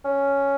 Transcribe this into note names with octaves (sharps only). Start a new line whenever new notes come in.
C#4